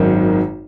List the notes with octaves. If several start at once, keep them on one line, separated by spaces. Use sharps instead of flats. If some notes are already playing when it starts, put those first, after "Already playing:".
Already playing: G#1 F#2 D#3